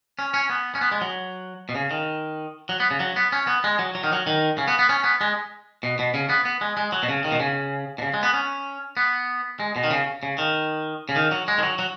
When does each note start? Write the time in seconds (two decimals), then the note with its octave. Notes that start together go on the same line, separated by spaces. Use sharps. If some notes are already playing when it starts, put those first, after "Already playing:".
0.19 C#4
0.34 C#4
0.50 B3
0.75 C#4
0.81 B3
0.92 G#3
1.01 F#3
1.69 B2
1.75 C#3
1.91 D#3
2.69 F#3
2.80 B3
2.91 C#3
3.00 F#3
3.16 B3
3.32 C#4
3.47 B3
3.64 G#3
3.79 F#3
3.95 F#3
4.04 D#3
4.13 F#3
4.27 D#3
4.58 C#3
4.68 B3
4.79 B3
4.89 C#4
5.04 B3
5.21 G#3
5.83 B2
5.99 B2
6.14 C#3
6.29 B3
6.45 B3
6.61 G#3
6.77 G#3
6.92 F#3
7.03 B2
7.09 C#3
7.24 D#3
7.32 B2
7.40 C#3
7.98 B2
8.02 C#3
8.14 G#3
8.23 B3
8.34 C#4
8.97 B3
9.60 G#3
9.76 B2
9.84 D#3
9.91 C#3
10.23 C#3
10.38 D#3
11.09 C#3
11.16 D#3
11.32 F#3
11.48 G#3
11.58 D#3
11.63 F#3
11.79 F#3